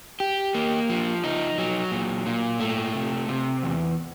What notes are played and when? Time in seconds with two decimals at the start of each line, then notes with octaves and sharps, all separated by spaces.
0.20 G4
0.55 A#3
0.89 F3
1.24 D#4
1.58 F#3
1.92 A#2
2.26 A#2
2.60 A3
2.95 C3
3.28 C3
3.63 E2